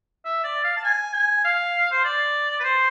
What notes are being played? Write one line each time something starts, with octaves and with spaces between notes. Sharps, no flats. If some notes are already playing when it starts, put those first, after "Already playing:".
E5
D5
F5
A5
G#5
G#5
F5
C5
D5
B4
C5